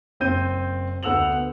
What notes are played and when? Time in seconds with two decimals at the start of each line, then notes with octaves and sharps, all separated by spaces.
0.20 F#1 C4 G6 D#7
1.03 D2 B3 F#5 E6 F7 F#7